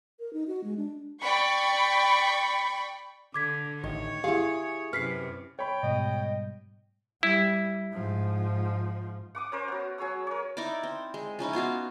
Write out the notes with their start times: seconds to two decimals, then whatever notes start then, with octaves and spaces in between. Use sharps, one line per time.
0.19 A#4
0.33 D#4
0.48 F#4
0.64 G#3
0.78 D4
1.21 D5 G5 B5 C#6
3.34 D3 D6 G#6 B6
3.84 A1 D#3 C#5
4.24 E4 G4 G#4 F5
4.93 F#2 C3 B4 F6 B6 C7
5.59 C#5 G5 B5
5.83 G#2 B2 G3 D#5
7.23 G3 E4
7.93 G#2 F3
9.35 F#5 D6 D#6
9.52 C#4 A#4 C5
9.68 B3 F#4
9.98 F#3 G#4 C#5 E6
10.27 A#4 C#5
10.57 D#4 E4 A#4 D5
10.83 C4
11.14 G#3
11.39 F3 C#4 D#4 E4
11.53 B3 F4 F#4 F5